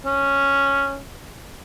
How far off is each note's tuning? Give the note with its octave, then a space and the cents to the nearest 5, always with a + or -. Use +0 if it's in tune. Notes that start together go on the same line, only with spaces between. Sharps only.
C#4 +0